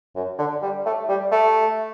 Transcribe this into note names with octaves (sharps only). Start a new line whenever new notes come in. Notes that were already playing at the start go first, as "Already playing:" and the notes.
F#2
D3
G3
A3
G3
A3